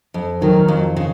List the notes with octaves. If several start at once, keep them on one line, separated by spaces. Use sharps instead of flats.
F2
D#3 F#3
F2
C#3